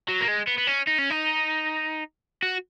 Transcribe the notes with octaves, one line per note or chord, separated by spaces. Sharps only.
F#3
A#3
G#3
B3
B3
C#4
D#4
C#4
D#4
F#4